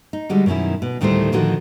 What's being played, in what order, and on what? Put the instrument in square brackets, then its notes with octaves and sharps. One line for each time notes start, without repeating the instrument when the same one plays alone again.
[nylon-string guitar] D#4
D3 G3 G#3 F#4
F#2 B2 D#3 C#4 E4
B2
D2 A2 D#3 G3 A3 C5
A2 D3 D#3 F3 F#4